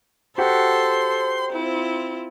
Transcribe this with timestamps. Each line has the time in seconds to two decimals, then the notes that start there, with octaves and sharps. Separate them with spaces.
0.38 F#4 G4 A4 C5 F#5 C6
1.53 C4 E4 F4